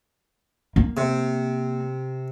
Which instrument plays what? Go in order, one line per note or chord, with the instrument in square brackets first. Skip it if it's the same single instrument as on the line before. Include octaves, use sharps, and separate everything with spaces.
[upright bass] A#3
[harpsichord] C3